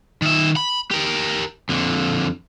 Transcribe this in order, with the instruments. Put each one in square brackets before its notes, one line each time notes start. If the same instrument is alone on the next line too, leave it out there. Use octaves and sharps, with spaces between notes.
[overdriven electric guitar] D#3 E5
B5
G4 A#4
F2 D3